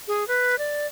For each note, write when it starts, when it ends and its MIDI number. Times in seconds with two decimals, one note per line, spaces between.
0.08 0.27 68
0.28 0.58 71
0.59 0.87 74